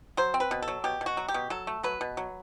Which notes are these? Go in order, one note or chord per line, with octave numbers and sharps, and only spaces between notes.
F#3 C5
C4
B4
B2
A4
F#3
B2 G4
B2
F#4
F#3
G4
B2
F#3 A4
A3
F#3 B4
B2
F#3